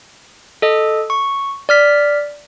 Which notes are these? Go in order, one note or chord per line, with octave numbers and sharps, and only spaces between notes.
A4 D#5
C#6
D5 F6 B6